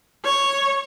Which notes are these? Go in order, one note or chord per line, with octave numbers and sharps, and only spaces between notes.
C#5